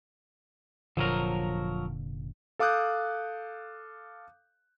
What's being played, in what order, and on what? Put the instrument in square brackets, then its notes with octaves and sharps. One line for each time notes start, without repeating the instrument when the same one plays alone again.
[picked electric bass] F1 A#2 D3 [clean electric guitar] F3 F#3 A#4
[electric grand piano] A4 F5 D6 D#6 F#6 G6